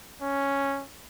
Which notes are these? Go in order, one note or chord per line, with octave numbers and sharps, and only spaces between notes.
C#4